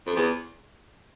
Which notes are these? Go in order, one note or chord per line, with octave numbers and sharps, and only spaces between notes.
F2
E2